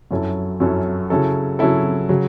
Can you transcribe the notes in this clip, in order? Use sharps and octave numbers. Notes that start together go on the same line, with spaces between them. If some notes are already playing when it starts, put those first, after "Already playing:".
F#2 F#3 C#4 E4 A4
F#2 F#3 C#4 E4 A4
C#3 F#3 C#4 E4 A4
C#3 F#3 C#4 E4 A4
C#3 F#3